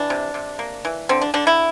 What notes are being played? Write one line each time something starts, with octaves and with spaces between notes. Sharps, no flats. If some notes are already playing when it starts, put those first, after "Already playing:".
Already playing: E3 D4
C3
C3
A#3
E3
D3 C4
D4
D3 D4
E4